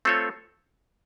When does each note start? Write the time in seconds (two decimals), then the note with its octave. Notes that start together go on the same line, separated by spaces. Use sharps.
0.05 A3 C4 F4 A4 C#5